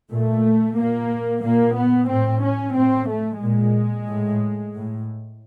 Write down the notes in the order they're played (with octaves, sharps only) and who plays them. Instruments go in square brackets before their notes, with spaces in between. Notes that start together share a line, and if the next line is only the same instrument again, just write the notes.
[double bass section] A#2 A3
A#2 A#3
A#2 A#3
B3
A2 C4
C#4
A2 C4
A3
A#2 G#3
A2
A2